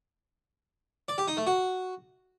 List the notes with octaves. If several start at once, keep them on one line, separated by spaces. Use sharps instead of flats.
D5
G4
D#4
A3
F#4